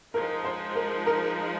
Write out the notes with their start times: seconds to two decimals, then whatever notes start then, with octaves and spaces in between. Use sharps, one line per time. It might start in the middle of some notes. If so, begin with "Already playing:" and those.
0.14 F3 G#3 D#4 A#4
0.44 C5
0.76 A#4
1.06 A#4